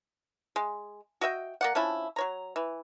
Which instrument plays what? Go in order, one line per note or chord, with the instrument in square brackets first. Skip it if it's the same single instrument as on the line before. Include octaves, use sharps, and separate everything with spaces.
[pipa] G#3
F#4 D#5 E5 G5
A#3 D5 F#5
F3 C#4 D4 E4
F#3 C#5 A#5
E3